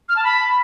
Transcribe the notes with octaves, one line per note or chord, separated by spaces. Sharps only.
F6
A5
B5